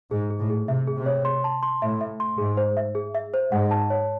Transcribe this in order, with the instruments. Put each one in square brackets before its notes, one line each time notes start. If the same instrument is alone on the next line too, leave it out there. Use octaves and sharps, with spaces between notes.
[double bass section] G#2 [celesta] G#4
[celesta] G#4
[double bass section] A2
[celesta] G#4
[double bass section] C3 [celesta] E5
[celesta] G#4
[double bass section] C3
[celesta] C#5
C6
A5
C6
[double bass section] A2 [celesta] E5
[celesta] E5
C6
[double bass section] G#2 [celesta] G#4
[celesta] C5
E5
G#4
E5
C5
[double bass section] G#2 [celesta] F#5
[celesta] A5
C#5